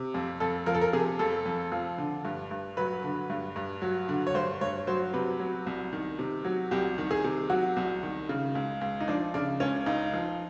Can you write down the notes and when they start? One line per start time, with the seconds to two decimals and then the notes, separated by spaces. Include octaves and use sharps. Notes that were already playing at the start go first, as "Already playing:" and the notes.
Already playing: C3
0.14 F2
0.40 F2 A4
0.66 F3 A#4
0.75 A4
0.81 A#4
0.93 C3 G#4
1.19 F2 A4
1.46 F2
1.72 F3
1.98 D3
2.25 G2
2.51 G2
2.77 F#3 B4
3.04 D3
3.30 G2
3.56 G2
3.82 F#3
4.09 D3
4.27 C#5
4.34 G2 C5
4.61 G2 C#5
4.87 F#3 C5
5.14 C3 B4
5.40 F#3
5.66 C2
5.93 D#3
6.19 C3
6.45 F#3
6.71 C2 G4
6.98 D#3
7.11 G#4
7.24 C3
7.50 F#3 F#4
7.76 C2
8.03 D#3
8.29 C#3
8.55 C#2
8.81 C#2
9.01 D#4
9.08 F3 D4
9.34 C#3 D4
9.60 C#2 C#4
9.86 C#2 D#4
10.13 F3